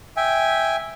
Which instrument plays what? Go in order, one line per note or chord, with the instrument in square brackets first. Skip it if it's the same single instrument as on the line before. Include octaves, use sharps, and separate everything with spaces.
[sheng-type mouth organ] E5 G5 G#5